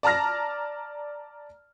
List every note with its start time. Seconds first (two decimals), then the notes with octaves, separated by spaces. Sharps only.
0.03 D5 A5 A#5 F6 A#6